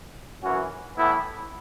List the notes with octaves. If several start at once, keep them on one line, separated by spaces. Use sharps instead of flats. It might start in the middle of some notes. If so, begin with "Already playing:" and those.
F#2 E3 C#4 F#4
A2 E3 B3 E4